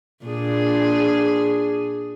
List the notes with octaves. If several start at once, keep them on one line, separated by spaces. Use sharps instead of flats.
A#2 D4 G#4